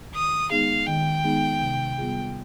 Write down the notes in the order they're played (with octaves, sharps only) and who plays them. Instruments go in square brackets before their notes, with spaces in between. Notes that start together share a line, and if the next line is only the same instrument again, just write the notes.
[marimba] D#3 [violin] D#6
[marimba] G#3 B3 D#4 G#4 [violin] F5
[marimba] D#3 [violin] G5
[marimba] G#3 B3 D#4 G#4
C3
G3 B3 F4 G#4